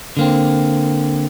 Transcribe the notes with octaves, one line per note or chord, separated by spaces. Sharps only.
D3 A#3 C4